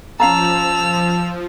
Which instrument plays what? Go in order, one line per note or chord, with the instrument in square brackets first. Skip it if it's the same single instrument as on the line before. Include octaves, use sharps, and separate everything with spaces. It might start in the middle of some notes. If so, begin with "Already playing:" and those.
[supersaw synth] F3 [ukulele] C#4 F5 A#5 [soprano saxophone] A5 [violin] E6 F7